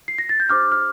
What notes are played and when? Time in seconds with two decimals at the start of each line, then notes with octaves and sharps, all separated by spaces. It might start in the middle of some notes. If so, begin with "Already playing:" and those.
0.08 C7
0.18 A#6
0.29 A6
0.40 G6
0.49 D4 G4 C5 D6 F6
0.72 F6